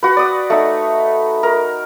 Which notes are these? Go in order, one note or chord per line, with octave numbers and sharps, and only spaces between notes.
F#4 B4
D5 D#6
A3 D#4
A#4